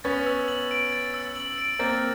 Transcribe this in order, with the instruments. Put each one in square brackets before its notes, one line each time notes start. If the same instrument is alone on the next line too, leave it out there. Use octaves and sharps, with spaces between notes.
[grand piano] B3 C#4 [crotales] A6
[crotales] E6
F#7
D7
A6
E6
F#7
D7
[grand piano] A#3 C4 [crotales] A6